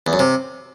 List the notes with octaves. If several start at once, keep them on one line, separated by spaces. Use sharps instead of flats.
E2
F#2
C3